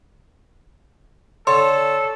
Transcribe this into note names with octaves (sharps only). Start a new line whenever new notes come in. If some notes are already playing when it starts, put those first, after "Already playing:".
D3 A4 C#5 C6